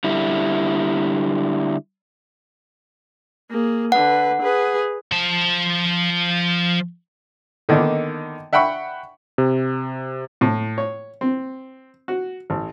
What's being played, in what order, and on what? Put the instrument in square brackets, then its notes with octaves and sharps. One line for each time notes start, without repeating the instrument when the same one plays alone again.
[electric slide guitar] D3 G3 E4
[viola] A#3 G#4
[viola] D3 B4 [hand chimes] F#5
[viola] G#4 B4
[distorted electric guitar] F3 A5
[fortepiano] D3 D#3 A#3 B3 D#4
E5 F#5 G5 B5 C#6
[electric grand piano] C3
[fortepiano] A2
C#5
C4
F#4
A1